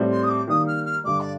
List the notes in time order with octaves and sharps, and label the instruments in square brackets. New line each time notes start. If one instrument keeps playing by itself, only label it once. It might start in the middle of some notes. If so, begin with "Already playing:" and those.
Already playing: [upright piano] A2 G3 C4
[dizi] C6
D#6
D6
[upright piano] D#3 G3 A#3 [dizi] D#6
[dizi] F6
F6
[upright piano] G2 D3 G3 [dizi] D6
[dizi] D5